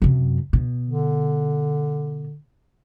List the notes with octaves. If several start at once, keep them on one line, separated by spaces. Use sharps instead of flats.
F#2 C3
B2
D3